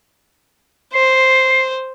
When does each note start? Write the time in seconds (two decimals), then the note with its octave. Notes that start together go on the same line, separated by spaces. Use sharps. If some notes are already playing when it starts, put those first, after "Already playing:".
0.94 C5 C7